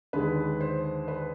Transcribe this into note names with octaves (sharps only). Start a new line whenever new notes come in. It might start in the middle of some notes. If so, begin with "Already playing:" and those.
D#2 D3 G#3 B4
C5
B4